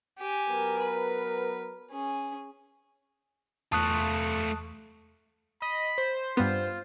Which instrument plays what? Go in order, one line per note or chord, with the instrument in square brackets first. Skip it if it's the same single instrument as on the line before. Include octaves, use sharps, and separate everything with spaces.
[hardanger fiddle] G4 G#5
[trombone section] F#3 B3 A#4
[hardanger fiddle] B4
C#4 G#4
[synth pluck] E2 C#6 [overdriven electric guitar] A3 F4 [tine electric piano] A5 D#6 F#6
[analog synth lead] D#5 [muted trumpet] B5
[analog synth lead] C5
[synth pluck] G2 B3 [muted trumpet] F4